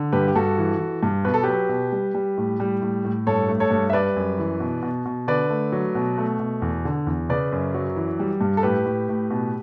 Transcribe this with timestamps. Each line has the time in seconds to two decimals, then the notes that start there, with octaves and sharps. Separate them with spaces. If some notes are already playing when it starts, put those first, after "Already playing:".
Already playing: D3
0.12 G2 G4 B4
0.28 G4
0.35 G2 F#4 A4
0.58 E3
0.80 E3
1.03 G2
1.25 B2 B4
1.34 A4
1.43 F#3 G4 B4
1.69 B2
1.92 G3
2.15 G3
2.37 A2
2.60 G3
2.82 A2
3.05 A2
3.27 G2 A4 C#5
3.48 A3
3.60 A4 C#5
3.71 G2
3.90 E5
3.93 G3 B4 D5
4.17 F#2
4.39 E3
4.60 B2
4.82 B2
5.05 B2
5.28 D3 B4 D5
5.50 A3
5.72 F#3
5.95 B2
6.18 A3
6.39 B2
6.62 E2
6.85 D3
7.07 E2
7.29 C#3 B4 D5
7.52 F#2
7.74 F#3
7.96 E3
8.19 G3
8.41 G2
8.57 A4
8.63 A2 G4 B4
8.86 A2
9.09 A2
9.30 B2